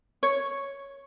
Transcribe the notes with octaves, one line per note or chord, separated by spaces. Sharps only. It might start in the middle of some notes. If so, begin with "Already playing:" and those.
C#5